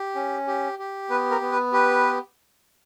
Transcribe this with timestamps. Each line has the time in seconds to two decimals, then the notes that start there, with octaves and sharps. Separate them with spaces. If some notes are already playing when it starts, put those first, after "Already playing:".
Already playing: G4
0.15 C#4
0.47 G4
0.79 G4
1.10 B3 B4
1.31 A#4
1.41 B3
1.52 B4
1.72 G4 B4